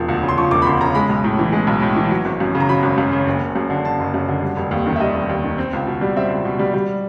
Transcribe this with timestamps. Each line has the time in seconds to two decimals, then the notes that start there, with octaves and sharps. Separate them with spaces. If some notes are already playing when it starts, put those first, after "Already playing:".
Already playing: E1 F3
0.08 D2
0.23 C#3
0.28 C6
0.37 F3 C#6
0.51 E1 D6
0.62 B5
0.66 D2 C6
0.81 C#3 A#5
0.95 G#3 B5
1.09 B1
1.24 A2
1.39 E3
1.52 G#3
1.67 B1
1.82 A2
1.96 E3
2.11 F#3
2.25 G#1
2.40 F#2
2.55 C#3
2.60 A#5
2.69 F#3 B5
2.83 G#1
2.98 F#2
3.12 C#3
3.27 F#1
3.41 F#1
3.56 F#2
3.70 D3
3.84 F#1 A5
3.99 F#1
4.14 F#2
4.29 D3
4.42 G3
4.57 F1
4.71 D#2
4.86 D#3
4.96 E5
5.00 G3 D#5
5.15 F1
5.29 D#2
5.44 D#3
5.58 C4
5.73 C#2
5.87 B2
6.01 G3
6.16 C4 E5
6.30 C#2
6.45 B2
6.59 G3
6.74 G3